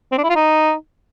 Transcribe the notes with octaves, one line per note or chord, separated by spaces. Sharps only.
C4
D4
E4
F4
D#4